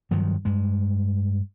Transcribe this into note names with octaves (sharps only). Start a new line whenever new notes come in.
G2 D#3 F3 F#3
G2 G#3